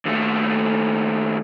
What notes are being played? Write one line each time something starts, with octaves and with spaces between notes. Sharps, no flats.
D#2 A3